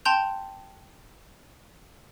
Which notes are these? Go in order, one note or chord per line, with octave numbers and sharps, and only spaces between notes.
G5 A5 C6 G6 F7